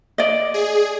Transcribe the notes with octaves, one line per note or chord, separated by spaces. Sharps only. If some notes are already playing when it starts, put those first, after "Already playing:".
D5 D#5
G#4